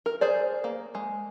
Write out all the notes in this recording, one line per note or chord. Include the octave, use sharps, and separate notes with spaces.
A#4
G#4 C5 D5
A#3
G#3